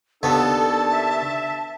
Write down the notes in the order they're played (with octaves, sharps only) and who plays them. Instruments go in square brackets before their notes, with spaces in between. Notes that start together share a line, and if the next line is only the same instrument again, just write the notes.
[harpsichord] D#2 B3 [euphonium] D4 [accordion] A4 [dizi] A5
[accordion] E5